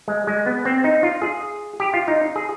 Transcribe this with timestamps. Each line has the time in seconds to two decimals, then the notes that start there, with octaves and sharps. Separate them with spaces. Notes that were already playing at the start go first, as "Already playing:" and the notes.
0.08 G#3
0.27 G#3
0.46 B3
0.65 C4
0.84 D#4
1.03 F4
1.22 G#4
1.80 G4
1.94 F4
2.08 D#4
2.36 G#4